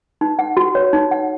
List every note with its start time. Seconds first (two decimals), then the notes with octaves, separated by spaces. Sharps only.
0.21 D#4
0.39 F#5
0.57 F#4
0.75 C#5
0.93 D#4
1.11 F#5